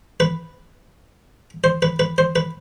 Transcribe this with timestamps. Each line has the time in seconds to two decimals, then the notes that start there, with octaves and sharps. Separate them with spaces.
0.20 B4
1.64 C5
1.82 B4
1.99 B4
2.18 C5
2.36 B4